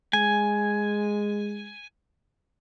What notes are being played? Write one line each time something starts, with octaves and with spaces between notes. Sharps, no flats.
G#3 G#5